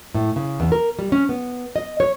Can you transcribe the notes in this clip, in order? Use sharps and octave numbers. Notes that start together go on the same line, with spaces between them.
A2
C#3
E2
A#4
G3
C#4
B3
D#5
C#5